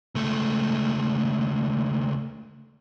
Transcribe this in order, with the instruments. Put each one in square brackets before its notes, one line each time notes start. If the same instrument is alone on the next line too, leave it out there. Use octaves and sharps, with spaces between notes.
[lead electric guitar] C#2 A3